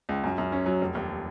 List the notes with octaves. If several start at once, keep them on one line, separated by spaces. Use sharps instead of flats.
C#2
F#2
F#2
C#4
F#3
F1
D#2